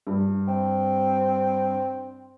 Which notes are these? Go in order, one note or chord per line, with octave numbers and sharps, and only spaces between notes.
G2
C4